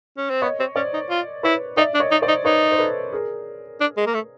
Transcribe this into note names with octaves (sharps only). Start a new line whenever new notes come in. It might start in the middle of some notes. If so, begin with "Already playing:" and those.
C#4
C4
B3 C#5 D#5
C4
C#4 C5 D5
D#4
F4
E4 B4 C#5
D#4 D5 E5
D4
C#5 D#5
D#4
C5 D5
D#4
D#4 B4 C#5
C5
A4 B4
G#4 A#4
D4
G#3
A#3
A3